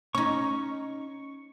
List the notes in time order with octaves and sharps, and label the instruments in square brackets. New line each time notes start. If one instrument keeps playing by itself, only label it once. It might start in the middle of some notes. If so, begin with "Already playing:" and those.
[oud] C#4 D#4 [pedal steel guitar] C#6